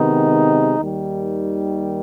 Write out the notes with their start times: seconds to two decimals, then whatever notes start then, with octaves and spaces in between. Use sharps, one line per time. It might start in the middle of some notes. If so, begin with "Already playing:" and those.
Already playing: C3 D#3 G#3 B3 D#4
0.79 D#2 D#3 G3